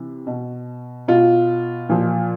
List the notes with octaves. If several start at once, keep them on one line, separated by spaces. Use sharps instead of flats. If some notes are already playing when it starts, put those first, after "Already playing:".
Already playing: C3 E3
B2
B2 F4
A#2 F3